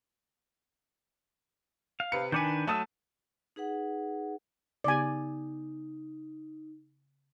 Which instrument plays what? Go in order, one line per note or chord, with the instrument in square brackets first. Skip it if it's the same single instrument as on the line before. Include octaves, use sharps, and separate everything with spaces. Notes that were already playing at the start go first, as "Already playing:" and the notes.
[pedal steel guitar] F5
[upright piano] C3 B4 C#7
[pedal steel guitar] D#3 D4 B4 [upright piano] G#5 D6 G6
[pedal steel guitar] F#3 D#6 E6 [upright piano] A3 A5 A6
[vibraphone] D#4 G#4 B4 F#5
[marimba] C#3 B3 G4 [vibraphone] D#4 [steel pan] D5 G#5